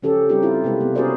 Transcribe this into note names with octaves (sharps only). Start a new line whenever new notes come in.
C#3 F3 C#4 G4 A4
G3 C4 D#4 G4
C4 E4 F4
C3 G#3 A#3 B4
B3
C#4 F#4 G#4 A#4 C5 D5